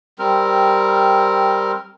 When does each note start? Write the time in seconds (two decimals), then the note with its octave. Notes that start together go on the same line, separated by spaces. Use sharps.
0.19 G3 C4 A#4